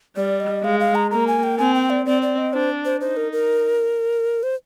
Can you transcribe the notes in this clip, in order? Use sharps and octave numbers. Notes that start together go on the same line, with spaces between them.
G3 D5
D#5
G#3 F5
F5
A#5
A#3 A#5
G#5
G5
C4 G#5
G5
D5
C4 D5
D5
D#5
D4 C5
C5
D#4 C5
A#4
A#4
C5